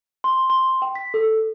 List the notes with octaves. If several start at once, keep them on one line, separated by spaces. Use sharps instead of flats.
C6
C6
G5
B6
A4